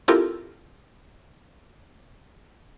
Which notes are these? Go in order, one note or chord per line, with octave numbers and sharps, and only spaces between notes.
C4 E4 F4 G4 A4 A#4